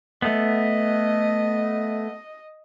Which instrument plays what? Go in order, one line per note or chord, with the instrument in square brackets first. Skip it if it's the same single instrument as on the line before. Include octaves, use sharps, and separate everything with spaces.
[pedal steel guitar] A3 B3 [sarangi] D#5